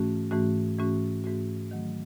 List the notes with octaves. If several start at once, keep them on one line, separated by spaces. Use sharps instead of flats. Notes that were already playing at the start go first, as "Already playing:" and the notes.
Already playing: G#2 E3 A3 C#4 F#4
G#2 E3 A3 C#4 F#4
G#2 E3 A3 C#4 F#4
G#2 E3 A3 C#4 F#4
D#3 F#3 A3